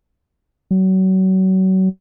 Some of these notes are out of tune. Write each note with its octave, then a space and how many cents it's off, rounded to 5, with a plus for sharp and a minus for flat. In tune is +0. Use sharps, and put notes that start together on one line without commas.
F#3 +30